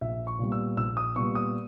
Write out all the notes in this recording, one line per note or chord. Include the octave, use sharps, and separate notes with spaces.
A#1 E5
C#6
A#2 G3 B3
E6
A#1 E6
D#6
A#2 G3 B3 C#6
D#6